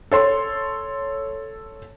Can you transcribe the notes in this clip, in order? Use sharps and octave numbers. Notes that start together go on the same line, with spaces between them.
A4 C#5 C6